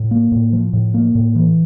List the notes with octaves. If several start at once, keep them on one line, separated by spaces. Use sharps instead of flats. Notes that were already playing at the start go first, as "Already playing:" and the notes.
Already playing: A2
A#3
A2
F3
A2
A#3
A2
E3